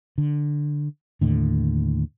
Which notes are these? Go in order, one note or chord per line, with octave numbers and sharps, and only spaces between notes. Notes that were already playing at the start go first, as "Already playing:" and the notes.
D3
D#2 A2 D3